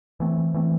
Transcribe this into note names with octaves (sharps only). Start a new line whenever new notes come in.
E3 A3 C4
E3 A3 C4